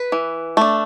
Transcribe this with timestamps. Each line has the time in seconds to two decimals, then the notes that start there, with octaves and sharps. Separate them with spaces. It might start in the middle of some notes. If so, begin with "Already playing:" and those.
Already playing: B4
0.12 E3
0.57 A3 D4